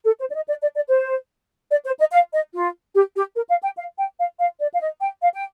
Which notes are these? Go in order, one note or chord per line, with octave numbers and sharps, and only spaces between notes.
A4
C5
D5
D#5
D5
D5
D5
C5
D5
C5
D#5
F5
D#5
F4
G4
G4
A#4
F5
G5
F5
G5
F5
F5
D5
F5
D#5
G5
F5
G5